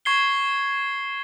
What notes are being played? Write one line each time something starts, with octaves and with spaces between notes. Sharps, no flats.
C#6 G#6 C7 G7